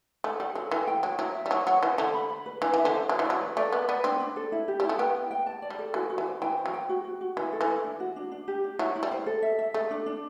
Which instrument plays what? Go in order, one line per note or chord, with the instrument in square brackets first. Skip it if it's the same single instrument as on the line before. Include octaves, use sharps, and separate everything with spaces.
[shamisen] A3 [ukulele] F#5
[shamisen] G3 [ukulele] F#5
[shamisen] F#3 [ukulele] A4
[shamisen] E3 [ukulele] G5
[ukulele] G5
[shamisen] F#3 [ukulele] G5
[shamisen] F#3 [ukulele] E4
[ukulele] E5
[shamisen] G3
[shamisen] F#3 [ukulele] E4
[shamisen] F#3 [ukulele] F#5
[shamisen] E3 [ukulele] C5
[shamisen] D3 [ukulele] F#5
[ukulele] B5
B5
B4
[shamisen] E3 [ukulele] D4
[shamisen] E3 [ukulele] E5
[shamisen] D3
[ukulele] C5
[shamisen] F#3 [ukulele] B4
[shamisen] E3
[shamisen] F#3 [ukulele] D5
[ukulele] B4
[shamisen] A3 [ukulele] D5
[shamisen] B3 [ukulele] B4
[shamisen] B3 [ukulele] D5
[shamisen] C4 [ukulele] D4
[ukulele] D4
A4
E4
G4
[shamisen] G3 [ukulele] E4
[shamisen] A3
[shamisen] B3 [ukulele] G5
[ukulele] G5
G5
A5
D5
[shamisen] G3
[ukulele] A4
[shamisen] E3 [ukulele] F#4
[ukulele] F#4
[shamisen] E3
[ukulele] C5
[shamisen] E3 [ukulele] G5
[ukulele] C5
[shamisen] F#3
[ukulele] G5
F#4
F#4
F#4
[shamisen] E3 [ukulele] E4
[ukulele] A4
[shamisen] E3
[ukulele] E4
D4
F#4
D4
D4
G4
D4
[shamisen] F#3 [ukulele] E4
[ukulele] E4
[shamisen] G3
[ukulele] C5
A4
E5
E5
[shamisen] A3 [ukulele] A4
[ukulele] D4
D4